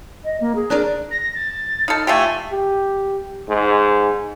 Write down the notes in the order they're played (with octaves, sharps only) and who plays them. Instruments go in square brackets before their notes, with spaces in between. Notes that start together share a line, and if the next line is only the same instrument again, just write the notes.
[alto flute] D#5
A#3
G#4
[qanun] D4 A#4 D5
[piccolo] A#6
A6
[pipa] D#4 A4 [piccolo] F6
[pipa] A3 F4 G4 [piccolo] G#5
[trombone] G4
G#2